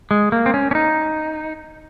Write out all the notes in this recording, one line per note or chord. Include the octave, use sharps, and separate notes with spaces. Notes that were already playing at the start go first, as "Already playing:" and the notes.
G#3
A#3
C4
C#4
C#4
D#4